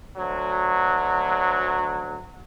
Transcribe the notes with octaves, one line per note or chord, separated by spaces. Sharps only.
D2 F#3